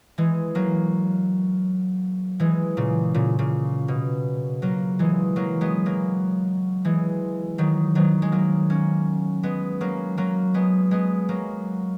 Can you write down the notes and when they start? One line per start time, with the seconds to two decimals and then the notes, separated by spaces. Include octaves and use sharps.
0.18 E3 G#3
0.55 F#3 A#3
2.40 E3 G#3
2.77 A#2 C#3
3.14 A#2 C#3
3.39 A#2 C#3
3.88 B2
4.62 F#3 A#3
4.99 E3 G#3
5.36 F#3 A#3
5.61 G#3 B3
5.86 F#3 A#3
6.85 E3 G#3
7.58 D#3 F#3
7.95 D#3 F#3
8.22 G#3
8.32 F#3 A#3
8.70 A#3 C#4
9.43 G#3 B3
9.81 F#3 A#3
10.17 F#3 A#3
10.54 G#3 B3
10.91 G#3 B3
11.29 F#3 A#3